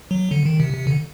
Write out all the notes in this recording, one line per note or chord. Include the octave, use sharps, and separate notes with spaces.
F#3
D3
D#3
C3
C3
D3